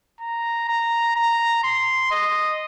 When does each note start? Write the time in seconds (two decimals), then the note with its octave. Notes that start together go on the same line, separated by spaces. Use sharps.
0.20 A#5
0.68 A#5
1.16 A#5
1.64 C6
2.11 D#5